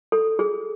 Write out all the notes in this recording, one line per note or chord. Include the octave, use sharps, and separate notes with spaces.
A4
G#4